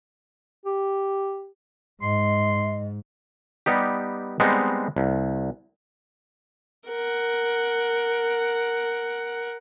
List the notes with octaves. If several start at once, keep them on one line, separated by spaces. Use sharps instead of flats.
G4
G#2 D#5 C6
G3 B3 D#4 G4
G3 G#3 B3 C4 D#4
C2
A#4 F#5